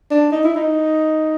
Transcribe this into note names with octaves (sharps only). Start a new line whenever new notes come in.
D4
D#4
E4
D#4